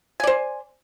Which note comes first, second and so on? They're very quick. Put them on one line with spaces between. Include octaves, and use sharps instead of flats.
G#5 D5 C5